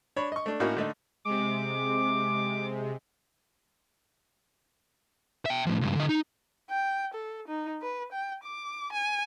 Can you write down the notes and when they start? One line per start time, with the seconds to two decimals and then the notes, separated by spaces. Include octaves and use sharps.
0.16 D4 C#5 B5
0.32 D#5 C#6
0.46 A3 D4
0.60 A2 A#3 C#4 D#4 F#4
0.77 D3 A3 D#4
1.25 C3 G#3 D6
5.46 E5 G5
5.66 A2 F3
5.81 C#2 G2
5.96 D3 D#5
6.09 D#4
6.70 G5
7.14 A4
7.48 D#4
7.82 B4
8.12 G5
8.44 D6
8.92 G#5